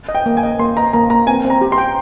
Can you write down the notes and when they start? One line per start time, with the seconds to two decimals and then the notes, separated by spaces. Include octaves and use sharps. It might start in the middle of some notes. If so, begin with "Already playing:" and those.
0.09 D#5
0.15 G5
0.26 A#3
0.37 G#5
0.43 D#5
0.59 A#3 C6
0.77 D#5 A#5
0.93 A#3 A#5
1.10 A#3 A#5
1.27 C4 G#5
1.45 C4 A#5
1.61 G4
1.72 C6
1.78 G5